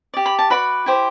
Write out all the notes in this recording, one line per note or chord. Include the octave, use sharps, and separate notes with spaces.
G4 D5
B5
A5
F#4 B4 D5 B5
E4 G4 C5